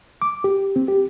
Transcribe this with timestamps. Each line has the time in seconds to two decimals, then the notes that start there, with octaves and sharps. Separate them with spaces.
0.22 D6
0.44 G4
0.76 C4
0.88 G4